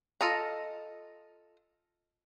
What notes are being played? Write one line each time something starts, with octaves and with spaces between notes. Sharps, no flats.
F4 A4 D#5 A#5